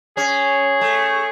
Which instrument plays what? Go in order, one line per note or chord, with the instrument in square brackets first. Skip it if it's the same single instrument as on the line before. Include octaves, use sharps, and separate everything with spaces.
[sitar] C#4 [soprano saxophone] G#4
[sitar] A3